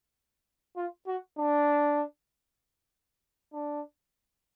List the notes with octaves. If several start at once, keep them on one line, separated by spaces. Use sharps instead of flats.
F4
F#4
D4
D4